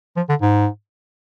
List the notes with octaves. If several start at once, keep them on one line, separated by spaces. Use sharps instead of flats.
F3
D3
G#2